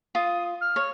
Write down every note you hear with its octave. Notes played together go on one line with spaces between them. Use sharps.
F4 D#6
F6
C#5